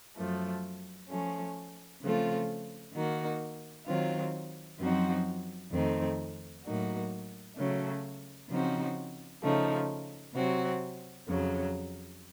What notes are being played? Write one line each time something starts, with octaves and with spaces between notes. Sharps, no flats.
F#2 F3 A3
F3 A3 C#4
C#3 F3 A3 C4 F4
D#3 A#3 D#4 F#4
D#3 F#3 C4 F4
F#2 F3 C4 D#4 F#4
F2 D#3 A3 C4 D#4
A2 F#3 A#3 D#4 F#4
C#3 F#3 A3
C#3 F3 C4 D#4 F#4
C#3 F3 A3 D#4
C3 F#3 C4 F#4
F2 C#3 F#3